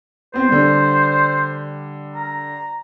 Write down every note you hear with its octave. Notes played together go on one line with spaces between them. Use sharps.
B3 C4 C5
D3 G3
A#5